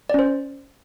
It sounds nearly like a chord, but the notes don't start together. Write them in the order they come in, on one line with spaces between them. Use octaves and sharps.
D5 C#4 C5